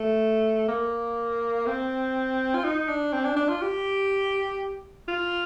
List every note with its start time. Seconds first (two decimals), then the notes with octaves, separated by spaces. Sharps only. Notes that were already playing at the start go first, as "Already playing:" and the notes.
Already playing: A3
0.68 A#3
1.66 C4
2.54 F4
2.64 D#4
2.88 D4
3.13 C4
3.25 D4
3.36 D4
3.49 F4
3.62 G4
5.08 F4